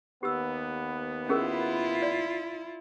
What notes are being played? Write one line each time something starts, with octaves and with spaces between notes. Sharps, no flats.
D#2 B3 G4 E6
C#4 E4 F4 G#4 A#4
D5